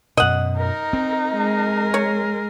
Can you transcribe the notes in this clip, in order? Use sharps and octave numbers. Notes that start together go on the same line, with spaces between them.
F#2 B2 D#5 F#5
D#4 A#4
C4
G#3 A#4
C#5